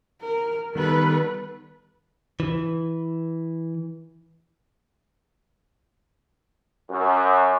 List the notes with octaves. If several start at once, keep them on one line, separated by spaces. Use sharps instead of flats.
A#4
D#3 G3 B3 A4 B4
E3
F#2